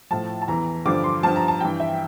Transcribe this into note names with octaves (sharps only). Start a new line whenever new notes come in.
A2 F3 A5
A5
E2 E3 A#5
G2 D3 F3 D6
C6
G2 F3 A5
A#5
A5
G2 E3 G5
E5